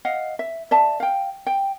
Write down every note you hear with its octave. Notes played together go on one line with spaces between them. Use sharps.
D#5 F5 F#5
E5
D5 E5 A5
F5 G5
G5